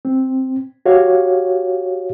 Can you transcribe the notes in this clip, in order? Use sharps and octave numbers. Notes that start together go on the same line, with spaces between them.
C4
F#4 G4 C#5 F5